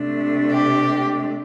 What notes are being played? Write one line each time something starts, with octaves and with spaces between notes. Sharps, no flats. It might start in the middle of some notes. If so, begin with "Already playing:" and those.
Already playing: C3 A3 D4
G4